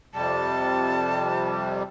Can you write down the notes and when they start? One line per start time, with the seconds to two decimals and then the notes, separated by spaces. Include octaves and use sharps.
0.14 F2 C3 G3 A5